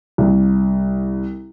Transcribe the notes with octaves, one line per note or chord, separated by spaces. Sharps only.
C2